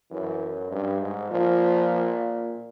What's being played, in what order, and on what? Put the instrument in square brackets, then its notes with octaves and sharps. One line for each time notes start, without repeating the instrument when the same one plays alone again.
[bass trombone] F#2 [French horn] E3
[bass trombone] G2
G#2
[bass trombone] A#2 [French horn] F3